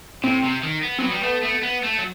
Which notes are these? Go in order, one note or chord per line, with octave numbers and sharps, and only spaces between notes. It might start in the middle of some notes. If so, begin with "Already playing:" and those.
A2 C4
C3
D#3
B3
F#3 B3 C4
G3
A3
A3
B3
A3
F#3